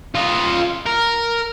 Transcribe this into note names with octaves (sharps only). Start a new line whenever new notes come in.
F4 D#5
A#4